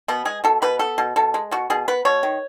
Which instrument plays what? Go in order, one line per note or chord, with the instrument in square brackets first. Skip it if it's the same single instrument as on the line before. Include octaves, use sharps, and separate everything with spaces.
[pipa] B2 B3
G#3 G#4
B2 A4
B2 B4
B3 A4
B2
B2 A4
G#3
B2 F#4
B2 G#4
B3 B4
B2 C#5
D#3